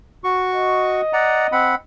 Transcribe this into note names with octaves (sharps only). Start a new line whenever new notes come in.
F#4 C#6
D#5
D5 F#5 A#5
C4 F#5 B5